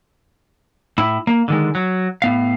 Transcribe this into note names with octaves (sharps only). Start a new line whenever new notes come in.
A2 E4
A#3
D3 D#3 G#3
F#3
A2 B3 F5